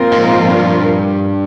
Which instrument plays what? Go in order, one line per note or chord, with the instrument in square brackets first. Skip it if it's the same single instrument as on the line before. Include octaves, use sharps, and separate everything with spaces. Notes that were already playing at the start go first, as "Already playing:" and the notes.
Already playing: [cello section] A#2 F3 C4 F4 A#4
[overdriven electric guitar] G#2
G2